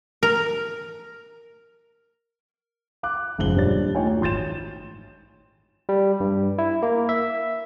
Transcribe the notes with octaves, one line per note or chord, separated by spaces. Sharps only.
A#4
F5 D6 F#6
F#1 G#2 F3 F#7 G7
D#1 G3 D4 C5 C#5 A6
A3 D#4 F4 C#5 G5 G#5
F#4 C#5
G#1 C6 G6 A6 E7
G3
G2
E4
A#3
E5